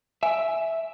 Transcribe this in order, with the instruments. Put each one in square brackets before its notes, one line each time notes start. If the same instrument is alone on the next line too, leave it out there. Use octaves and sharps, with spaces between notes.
[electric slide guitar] E5 [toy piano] G#5